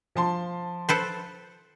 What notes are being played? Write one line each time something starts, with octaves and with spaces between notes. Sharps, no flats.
F3 A5 C6
A4 B4 C5